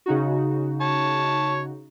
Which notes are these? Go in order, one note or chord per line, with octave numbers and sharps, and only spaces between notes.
C#3 D#4 F#4
C#5 A5